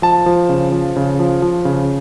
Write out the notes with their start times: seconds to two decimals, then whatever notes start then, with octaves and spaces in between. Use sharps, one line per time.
0.02 F3 A5
0.26 F3
0.49 C#3
0.72 F3
0.96 C#3
1.19 F3
1.42 F3
1.65 C#3